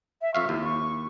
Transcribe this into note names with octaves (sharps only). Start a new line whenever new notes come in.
E5
F2 E5 F5 C#6
D#2 E4
C#6